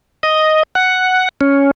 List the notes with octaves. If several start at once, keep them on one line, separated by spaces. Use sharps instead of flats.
D#5
F#5
C#4